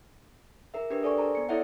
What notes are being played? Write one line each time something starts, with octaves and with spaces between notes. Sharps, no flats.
G#4 A#4 E5
D4 G4 G#4 A#4 B4
A4 D5 G#5 C#6
C5 A5 A#5
B3 C#7
E4 A4 C#5 D5 E5 F#5